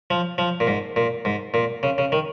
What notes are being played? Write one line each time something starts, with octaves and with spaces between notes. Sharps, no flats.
F3
F3
A#2
G#2
A#2
G#2
A#2
C#3
C#3
D#3